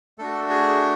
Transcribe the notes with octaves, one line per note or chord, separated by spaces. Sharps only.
A3 D4 F#4 A4
G#4